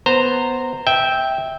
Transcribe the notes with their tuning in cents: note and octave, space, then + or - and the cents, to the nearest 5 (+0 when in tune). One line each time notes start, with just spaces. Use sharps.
B3 +0 C5 +0 A#5 -15
E5 -15 G5 +0